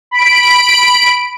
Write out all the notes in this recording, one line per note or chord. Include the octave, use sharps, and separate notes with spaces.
B5 D7